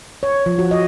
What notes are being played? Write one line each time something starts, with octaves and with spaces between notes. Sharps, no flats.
C#5
F3
F#4
D#5